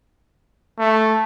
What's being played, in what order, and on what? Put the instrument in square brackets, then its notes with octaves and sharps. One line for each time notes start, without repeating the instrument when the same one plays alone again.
[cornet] A3